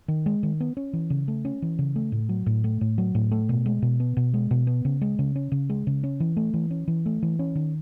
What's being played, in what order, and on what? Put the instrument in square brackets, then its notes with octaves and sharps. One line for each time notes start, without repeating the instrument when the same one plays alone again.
[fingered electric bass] D#3
G#3
D#3
B3
C#4
E3
C#3
A3
C#4
E3
C#3
A3
A2
F#3
A2
A3
A2
F#3
A2
A3
B2
G#3
B2
B3
B2
G#3
B2
B3
C#3
G#3
C#3
C#4
C#3
G#3
C#3
C#4
E3
A3
E3
C#4
E3
A3
E3
C#4
D#3